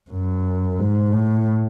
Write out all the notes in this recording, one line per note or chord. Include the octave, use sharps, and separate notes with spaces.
F#2
G#2
A2